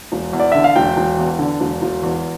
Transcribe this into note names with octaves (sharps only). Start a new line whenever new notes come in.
E1
E2
D5
D3 E5
F5
E1 G5
E1
E2
D3
E1
E1
E2